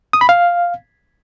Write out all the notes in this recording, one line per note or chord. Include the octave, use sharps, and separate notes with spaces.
D#6
B5
F5